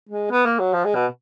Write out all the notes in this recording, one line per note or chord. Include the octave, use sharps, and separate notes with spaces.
G#3
B3
A#3
F#3
F3
G#3
B2